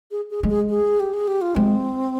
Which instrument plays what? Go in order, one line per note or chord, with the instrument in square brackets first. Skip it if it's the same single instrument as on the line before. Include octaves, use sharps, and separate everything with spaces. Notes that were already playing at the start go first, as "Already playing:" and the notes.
[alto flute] G#4
G#4
[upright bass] G#3
[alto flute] G#4
G#4
G4
G#4
G4
F4
[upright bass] G#3 [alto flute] C4